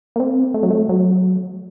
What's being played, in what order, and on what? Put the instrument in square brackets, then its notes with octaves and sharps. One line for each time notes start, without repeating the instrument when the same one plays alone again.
[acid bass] A#3
C4
A3
F#3
A3
F#3